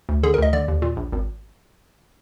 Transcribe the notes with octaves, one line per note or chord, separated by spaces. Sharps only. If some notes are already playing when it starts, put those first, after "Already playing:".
D2
D3 G#4
A#4
D2 D#5
D3 D5
D#2
A#2
A#1
G#1